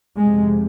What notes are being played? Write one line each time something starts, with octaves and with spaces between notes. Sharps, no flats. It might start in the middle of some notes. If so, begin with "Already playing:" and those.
F2 C3 G#3